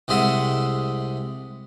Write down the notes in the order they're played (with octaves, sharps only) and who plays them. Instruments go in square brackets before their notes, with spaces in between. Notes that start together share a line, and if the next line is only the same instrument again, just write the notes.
[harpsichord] C2 C3 G#3 G#4 E5 F#5